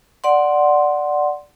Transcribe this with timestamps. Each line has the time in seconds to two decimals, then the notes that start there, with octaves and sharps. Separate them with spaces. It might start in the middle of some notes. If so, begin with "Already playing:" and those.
0.24 D5 F#5 C6